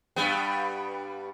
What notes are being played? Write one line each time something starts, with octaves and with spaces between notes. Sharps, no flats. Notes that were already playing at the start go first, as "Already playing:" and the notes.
G2 G3 B3